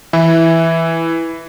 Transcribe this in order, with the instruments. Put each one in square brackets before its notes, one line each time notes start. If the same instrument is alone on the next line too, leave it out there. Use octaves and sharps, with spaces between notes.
[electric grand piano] E3 [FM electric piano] E4